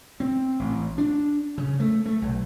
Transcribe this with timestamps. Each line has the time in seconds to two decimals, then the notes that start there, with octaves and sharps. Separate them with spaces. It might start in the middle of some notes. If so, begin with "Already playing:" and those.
0.20 C4
0.60 A1
0.98 D4
1.58 C#3
1.80 A3
2.06 A3
2.22 B1